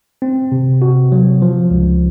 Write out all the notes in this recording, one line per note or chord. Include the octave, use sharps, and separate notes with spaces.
C4
C3
F#4
F#3
F3
C#2